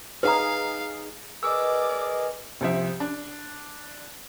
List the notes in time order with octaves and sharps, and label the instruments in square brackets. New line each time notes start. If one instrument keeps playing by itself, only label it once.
[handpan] D#4 G#4 [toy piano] B4 A#5 [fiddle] F5
[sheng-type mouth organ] G#4 A#4 [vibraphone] B4 D#5 [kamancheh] D5 D6 [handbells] E6
[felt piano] C2 F3 E5
D4